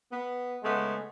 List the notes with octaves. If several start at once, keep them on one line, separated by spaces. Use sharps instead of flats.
B3
C#3 G#3 A3 B3